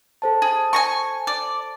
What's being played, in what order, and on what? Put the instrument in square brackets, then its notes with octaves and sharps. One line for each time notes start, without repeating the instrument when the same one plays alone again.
[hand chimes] A4 C5 A5
[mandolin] G#4
G#5 A#5 C#6
D5